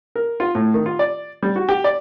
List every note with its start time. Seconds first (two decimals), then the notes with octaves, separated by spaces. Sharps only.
0.16 A#4
0.40 F4
0.55 A2
0.74 D#3
0.86 F4
0.99 D5
1.42 G3
1.56 F#4
1.69 G4
1.84 D5